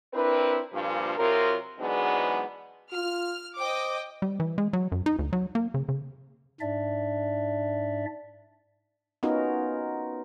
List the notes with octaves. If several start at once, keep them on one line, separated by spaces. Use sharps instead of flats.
C4 D4 E4 A#4 B4
G2 A#2 F3
C3 F#3 F4 A#4
G#2 E3 F#3 G#3 B3 D4
F4 F6
C5 D#5 G5 D6
G3
E3
G#3
F#3
F#2
D#4
D2
F#3
A#3
C#3
C#3
G#2 D4 D5 E5
B3 C#4 D#4 F4 F#4 A#4